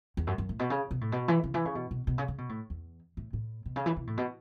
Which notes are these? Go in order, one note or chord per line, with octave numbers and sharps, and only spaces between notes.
E2
F#2
F#2
A2
B2
C#3
B2
A2
B2
E3
C#3
E3
C#3
B2
B2
B2
C#3
C#3
B2
A2
E2
A2
A2
B2
C#3
E3
B2
A2
B2